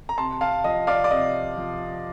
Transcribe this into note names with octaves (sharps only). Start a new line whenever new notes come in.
A#5
C3 A5 C6
F5 A5
F3 D#5
D5 F5
D5
C3 D#5
F3